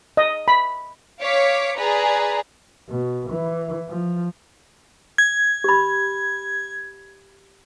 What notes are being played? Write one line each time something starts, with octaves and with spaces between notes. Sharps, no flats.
D#5
B5
C#5 F5 D6 B6 C#7
G#4 B4 D5 A#5
B2
E3
F3
G#6
G4 B5